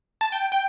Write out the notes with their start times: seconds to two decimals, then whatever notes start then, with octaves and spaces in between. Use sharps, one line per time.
0.21 A5
0.32 G5
0.52 G5